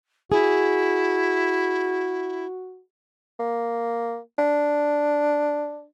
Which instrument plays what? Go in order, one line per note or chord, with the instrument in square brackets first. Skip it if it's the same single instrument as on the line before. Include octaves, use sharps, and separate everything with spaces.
[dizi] E4 [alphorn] F#4 [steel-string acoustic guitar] G#4
[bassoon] A#3
D4